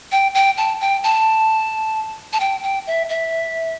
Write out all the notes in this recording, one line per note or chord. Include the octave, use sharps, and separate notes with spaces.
G5
G5
A5
G5
A5
A5
G5
G5
E5
E5